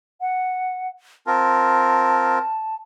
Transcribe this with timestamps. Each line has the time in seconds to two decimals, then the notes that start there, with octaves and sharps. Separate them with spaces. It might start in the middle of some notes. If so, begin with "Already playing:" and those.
0.21 F#5
1.27 C4 F4 A#4 A5